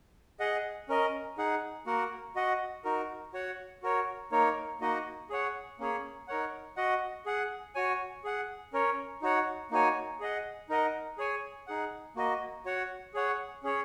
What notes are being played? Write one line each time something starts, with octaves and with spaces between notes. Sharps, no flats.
G#4 D#5 F#5
C#4 A#4 D#5
D#4 G#4 F#5
A#3 F#4 A#4 F#5
F#4 D#5 F#5
D#4 F#4 A#4
F#4 C#5 F#5
F#4 A#4 C#5
A#3 D#4 A#4 C#5
A#3 D#4 F#4 D#5 F#5
G#4 C#5 F#5
A#3 C#4 G#4 C#5
D#4 A#4 C#5 F#5
F#4 D#5 F#5
G#4 F#5
F#4 C#5 G#5
G#4 F#5
C#4 A#4 C#5
D#4 F#4 C#5 F#5
A#3 D#4 F#4 C#5 G#5
G#4 D#5 F#5
D#4 A#4 D#5 F#5
G#4 C#5 G#5
D#4 G#4 F#5
A#3 F#4 D#5
F#4 C#5 F#5
G#4 C#5 F#5
C#4 G#4 C#5